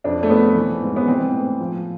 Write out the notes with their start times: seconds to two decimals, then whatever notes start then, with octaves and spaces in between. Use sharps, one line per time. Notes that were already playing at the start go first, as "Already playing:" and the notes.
0.04 F2 D4
0.23 A3
0.30 F2 B3
0.56 E3
0.82 G#2
0.96 B3
1.07 E3 C4
1.33 A2
1.60 F3